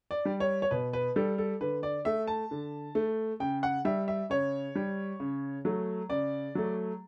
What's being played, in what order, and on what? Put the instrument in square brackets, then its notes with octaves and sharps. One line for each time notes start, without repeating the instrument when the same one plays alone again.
[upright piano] D5
G3
C#5
C#5
B2 B4
B4
G3 A4
A4
D3 B4
D5
A3 E5
A5
D3
A3
C#3 G5
F#5
G3 E5
E5
C#3 C#5
G3
C#3
F#3 A3
C#3 D5
F#3 A3